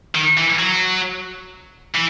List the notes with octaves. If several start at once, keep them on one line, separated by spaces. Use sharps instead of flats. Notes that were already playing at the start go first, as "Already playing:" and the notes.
D#3
E3
F#3
E3